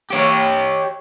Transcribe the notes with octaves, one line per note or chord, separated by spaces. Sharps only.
G4 C#5